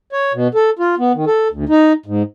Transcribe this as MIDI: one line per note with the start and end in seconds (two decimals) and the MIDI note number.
0.13 0.33 73
0.34 0.48 47
0.55 0.70 69
0.79 0.95 65
0.99 1.12 59
1.15 1.25 51
1.27 1.48 69
1.51 1.65 38
1.69 1.93 63
2.06 2.23 44